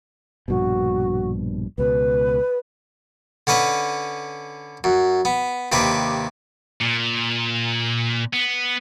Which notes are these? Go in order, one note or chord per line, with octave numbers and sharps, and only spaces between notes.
A#1 G2 B2 F#4
C#2 B2 B4
D3 C#4 B4 D#5
F#2
B3
D#2 C3 D4 B4
A#2
B3